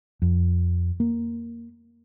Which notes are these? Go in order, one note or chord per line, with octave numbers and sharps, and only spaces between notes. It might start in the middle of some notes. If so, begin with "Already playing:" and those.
F2
A#3